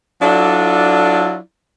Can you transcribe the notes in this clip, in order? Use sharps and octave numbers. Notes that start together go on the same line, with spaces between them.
F#3 D4 E4 F4 A4 D5